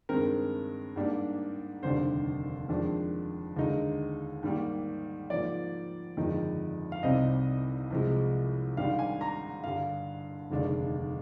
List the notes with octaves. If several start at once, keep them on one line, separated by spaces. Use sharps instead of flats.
G2 D#3 G#3 C4 A#4
G#2 G3 A#3 D4
F1 D#2 D3 G3 D4 C5
F2 D#3 G#3 D4
D#2 D3 G#3 D#4
G#2 D#3 G3 A#3
G#2 F3 A#3 D5
G1 F2 D#3 G#3 D#4
F5
C2 C3 G3 C4 D#4 D#5
C2 C3 F3 G#3
G#1 G#2 G3 D4 F5
G#5
A#5
G2 D3 G3 F5
F1 D#2 D3 G#3 D4